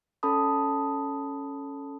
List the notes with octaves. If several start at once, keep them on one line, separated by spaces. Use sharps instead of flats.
C#4 A4 A5 B5 D#6